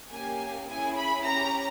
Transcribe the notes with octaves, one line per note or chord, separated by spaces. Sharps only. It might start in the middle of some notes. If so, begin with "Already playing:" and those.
A#3 C#4 G4 G#5
C#4 E4 G#4 G#5
B5
C#4 G4 A#5